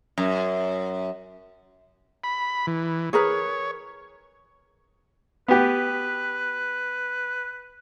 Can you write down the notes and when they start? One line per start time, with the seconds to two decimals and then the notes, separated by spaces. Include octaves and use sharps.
0.18 F#2
2.24 B5
2.67 E3
3.13 G#4 A#4 B4 C#5
5.48 B3 G4 B4